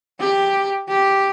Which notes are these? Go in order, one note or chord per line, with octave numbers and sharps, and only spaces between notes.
G4
G4